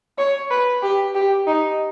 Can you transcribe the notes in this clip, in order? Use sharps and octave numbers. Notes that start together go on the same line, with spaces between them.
C#5
B4
G4
G4
D#4